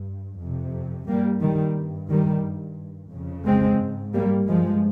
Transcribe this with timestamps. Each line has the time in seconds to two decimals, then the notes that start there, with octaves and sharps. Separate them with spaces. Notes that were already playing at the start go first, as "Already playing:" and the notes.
Already playing: G2
0.39 F2 C3
1.07 G2 G3 A#3
1.41 D#3 G3
1.75 G2
2.09 D#3 G3
2.43 G2
3.12 F2 C#3
3.46 G#3 C4
3.80 G#2
4.14 G3 A#3
4.48 G2 F3 G#3